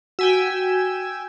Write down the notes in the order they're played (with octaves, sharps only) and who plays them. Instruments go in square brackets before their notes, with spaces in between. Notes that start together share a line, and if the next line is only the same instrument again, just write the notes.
[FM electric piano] F#4 B6 [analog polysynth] G5 G#5 E6